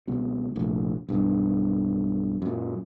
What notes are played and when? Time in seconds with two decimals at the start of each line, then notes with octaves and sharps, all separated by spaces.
0.07 C#2 B2
0.55 F1 A#1 A2
1.09 B1 G2
2.42 F#2 A#2